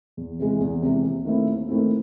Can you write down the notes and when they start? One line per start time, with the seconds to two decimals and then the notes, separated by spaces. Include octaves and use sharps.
0.17 E2
0.39 C3 E3 G#3
0.60 E2
0.82 C3 E3 G#3
1.03 D#2
1.25 D#3 A3 C4 E4
1.47 D#2
1.68 D#3 A3 C4 E4